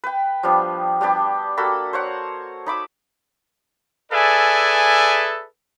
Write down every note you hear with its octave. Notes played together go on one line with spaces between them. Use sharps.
B4 G5
F3 G3 B3 D4
G3 B3 D4 G4
A#3 F#4 A4 B5
C5 C#5 F#5
D#4 B5 D6 E6
G#4 A4 B4 D5 E5 G#5